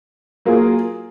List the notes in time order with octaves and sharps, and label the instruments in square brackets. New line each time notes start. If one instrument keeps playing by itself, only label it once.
[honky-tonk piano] F#3 A#3 F4 G#4